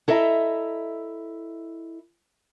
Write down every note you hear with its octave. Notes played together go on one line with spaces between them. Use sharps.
E4 A4 D#5 E5 A#5